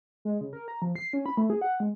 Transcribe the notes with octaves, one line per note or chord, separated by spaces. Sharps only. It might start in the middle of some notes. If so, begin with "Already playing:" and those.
G#3
C#3
A#4
A#5
F3
C7
C#4
B5
A3
G#4
F#5
G#3